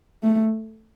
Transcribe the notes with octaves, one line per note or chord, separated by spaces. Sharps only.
A3